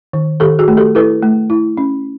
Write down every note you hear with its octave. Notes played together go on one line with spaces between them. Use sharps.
D#3
D#3 G4 A4
F#4 G#4
A3
G4 A4
E4 A4 B4
A3
E4
C#4